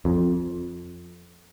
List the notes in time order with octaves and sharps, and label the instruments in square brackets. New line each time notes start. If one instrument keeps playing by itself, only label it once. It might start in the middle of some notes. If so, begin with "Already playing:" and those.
[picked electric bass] F2